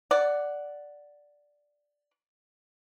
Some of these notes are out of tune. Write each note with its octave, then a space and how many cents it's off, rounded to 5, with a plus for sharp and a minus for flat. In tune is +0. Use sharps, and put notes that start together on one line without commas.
D5 +0 F#5 +5